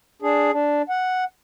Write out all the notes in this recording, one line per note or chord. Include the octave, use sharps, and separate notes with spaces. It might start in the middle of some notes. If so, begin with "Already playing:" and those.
D4 G#4
D4
F#5